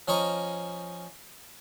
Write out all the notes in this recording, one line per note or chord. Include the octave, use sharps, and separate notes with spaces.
F3 C#4 C#5 D#5 A#5